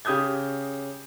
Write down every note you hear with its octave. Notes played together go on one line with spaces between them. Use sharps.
C#3 G4 D#6 G6 G#6